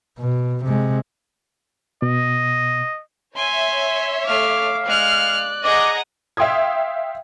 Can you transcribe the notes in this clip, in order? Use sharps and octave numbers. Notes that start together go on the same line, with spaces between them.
B2
C3 G#3
B2 D#5
C#5 E5 G#5 C6
A3 F5 D6 F6
G#3 D5 F6 F#6
G#4 D#5 F#5 A#5 D6
E5 F5 G5 C6 D#6 G#6